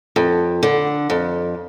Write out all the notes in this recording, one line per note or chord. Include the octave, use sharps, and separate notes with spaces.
F2
D3
F2